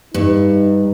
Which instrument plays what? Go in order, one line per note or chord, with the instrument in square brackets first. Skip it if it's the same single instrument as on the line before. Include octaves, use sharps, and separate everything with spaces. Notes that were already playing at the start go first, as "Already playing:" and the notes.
[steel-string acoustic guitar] G2 [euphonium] D#4